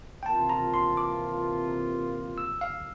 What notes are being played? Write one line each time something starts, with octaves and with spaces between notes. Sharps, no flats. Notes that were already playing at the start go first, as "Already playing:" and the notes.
G5
C3 E3 A#3 F4 A5
A#5
C6
D6
E6
F5